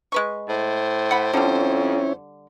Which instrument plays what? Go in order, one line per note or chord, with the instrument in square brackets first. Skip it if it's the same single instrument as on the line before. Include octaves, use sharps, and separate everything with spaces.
[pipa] G#3 B4 C#6
[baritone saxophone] A2 [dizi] C5
[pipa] F#5 B5
[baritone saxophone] F2 [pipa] D3 G3 [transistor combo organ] C#4 E4 C#5